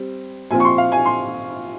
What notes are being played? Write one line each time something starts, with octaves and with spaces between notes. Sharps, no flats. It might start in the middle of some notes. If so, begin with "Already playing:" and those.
Already playing: G3 C4
A#2 F3 C4 F4 G#5
C#6
C6
F5
G#5
C6